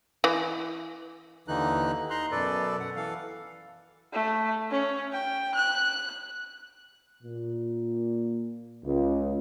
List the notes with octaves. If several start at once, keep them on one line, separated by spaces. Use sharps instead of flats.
E3
D#2 D3 E3 D#4 F#6
D#4 A#5 C6 F#6
F#2 B2 A4 B4 D5
F#5
E3 A4 F5
A3
C#4
G5
F#6
A#2
C#2